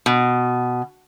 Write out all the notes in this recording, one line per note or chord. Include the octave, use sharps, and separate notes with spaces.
B2